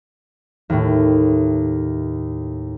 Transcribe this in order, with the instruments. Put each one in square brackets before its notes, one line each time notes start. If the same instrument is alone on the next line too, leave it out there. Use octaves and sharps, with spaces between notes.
[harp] D#2 A2